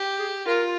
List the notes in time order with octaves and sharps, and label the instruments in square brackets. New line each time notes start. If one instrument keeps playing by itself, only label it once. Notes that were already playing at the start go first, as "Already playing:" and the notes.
Already playing: [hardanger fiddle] G4
[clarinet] G#4
[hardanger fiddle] F4 [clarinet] A#4